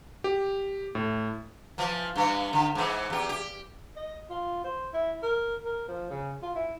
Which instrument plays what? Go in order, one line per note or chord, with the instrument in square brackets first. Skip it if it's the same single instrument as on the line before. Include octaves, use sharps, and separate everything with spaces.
[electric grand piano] G4
A2
[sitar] E3 F3
G2 E3
D3
G#2 E3
E2 G4
G4
[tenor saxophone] D#5
F4
C5
E4
A#4
A#4
F3
C#3
F4
E4